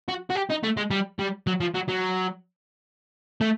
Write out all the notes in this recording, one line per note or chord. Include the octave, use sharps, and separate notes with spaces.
F#4
F#4
G4
D#4
A3
G#3
G3
G3
F#3
F3
F#3
F#3
A3